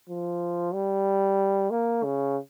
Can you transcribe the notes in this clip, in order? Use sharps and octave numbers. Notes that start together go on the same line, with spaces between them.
F3
G3
A#3
C#3